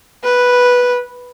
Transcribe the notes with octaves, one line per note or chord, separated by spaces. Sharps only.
B4